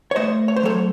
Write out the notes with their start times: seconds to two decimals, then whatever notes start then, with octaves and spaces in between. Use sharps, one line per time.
0.11 C#5
0.16 A3 C5 D#5
0.48 C#5
0.56 C5
0.63 F#3 A4 C#5